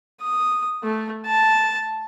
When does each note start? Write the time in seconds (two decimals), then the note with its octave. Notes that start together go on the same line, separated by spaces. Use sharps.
0.21 D#6
0.83 A3
1.26 A5